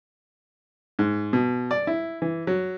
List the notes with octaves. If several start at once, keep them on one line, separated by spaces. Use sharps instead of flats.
G#2
B2
D5
E4
E3
F#3